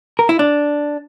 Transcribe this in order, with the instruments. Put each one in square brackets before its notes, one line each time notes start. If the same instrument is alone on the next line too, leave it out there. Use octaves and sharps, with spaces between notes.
[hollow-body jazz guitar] A#4
E4
D4